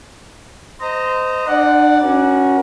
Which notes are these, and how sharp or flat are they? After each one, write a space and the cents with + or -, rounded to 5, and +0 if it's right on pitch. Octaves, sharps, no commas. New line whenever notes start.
C5 -25 D#5 +0 A#5 -25
D4 +35 D5 +0 F#5 +0
C#4 +0 F#4 +0 A#4 +40